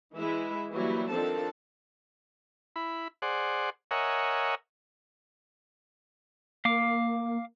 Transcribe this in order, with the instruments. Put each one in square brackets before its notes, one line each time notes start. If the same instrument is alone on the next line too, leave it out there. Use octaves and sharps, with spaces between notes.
[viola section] E3 G#3 E4 E5
E3 F#3 G3 A#3 E4
D#3 F3 C4 D4 A4 A5
[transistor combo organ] E4 B5
G#4 C5 D5 F#5
A#4 C#5 D#5 E5 F#5 G#5
[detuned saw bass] A#3 [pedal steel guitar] F5 D6